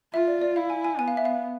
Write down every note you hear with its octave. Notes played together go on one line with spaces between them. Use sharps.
F4 E5
D5
D5
E4 F5
G#5
G#5
B3 G#5
F5
E5
F5